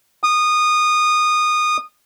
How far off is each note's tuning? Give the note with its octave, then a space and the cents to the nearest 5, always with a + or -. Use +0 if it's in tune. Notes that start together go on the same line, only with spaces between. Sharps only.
D#6 -20